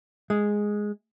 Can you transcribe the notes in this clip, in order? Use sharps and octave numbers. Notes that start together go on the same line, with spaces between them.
G#3